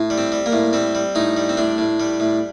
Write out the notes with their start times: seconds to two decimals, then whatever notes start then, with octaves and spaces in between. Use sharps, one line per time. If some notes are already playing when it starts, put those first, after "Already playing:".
Already playing: A2
0.10 G3
0.18 C4
0.32 G3
0.46 A#3
0.52 A2
0.73 G3 C4
0.95 G3
1.15 A2 D#4
1.37 G3
1.49 C4
1.57 A2 D4
1.78 A2
2.00 G3
2.20 A2